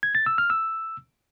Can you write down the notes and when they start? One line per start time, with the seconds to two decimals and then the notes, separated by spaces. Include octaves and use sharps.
0.03 G#6
0.15 A6
0.26 E6
0.38 F6
0.50 E6